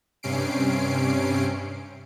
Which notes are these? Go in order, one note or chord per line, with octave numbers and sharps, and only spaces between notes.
G2 C3 C#4 C7 D7